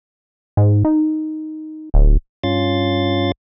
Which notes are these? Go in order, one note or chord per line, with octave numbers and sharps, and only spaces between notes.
G#2
D#4
D1
G2 C#4 F4 C6 A6